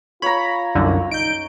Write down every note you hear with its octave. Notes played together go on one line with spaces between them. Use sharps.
F4 C#5 A#5 B5
C2 F#2 D3
D#4 G6 D7